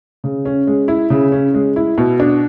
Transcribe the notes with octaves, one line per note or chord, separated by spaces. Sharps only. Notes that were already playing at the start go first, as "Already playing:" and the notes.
C#3
C#4
G#3
E4
C#3
C#4
G#3
E4
B2
D4